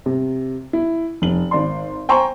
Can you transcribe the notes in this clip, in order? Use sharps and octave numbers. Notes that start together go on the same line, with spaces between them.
C3
E4
F1 F#7
G#1 D5 C6
C5 G5 G#5 A#5 C6 C#6